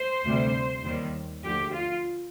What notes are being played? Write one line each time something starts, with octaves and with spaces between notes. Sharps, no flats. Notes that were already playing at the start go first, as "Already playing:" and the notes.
Already playing: C5
D2 C3 G3
D#2 D#3 G3
D2 D3 F3 G4
F4